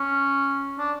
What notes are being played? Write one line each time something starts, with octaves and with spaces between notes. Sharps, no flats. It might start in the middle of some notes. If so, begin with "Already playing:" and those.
Already playing: C#4
D4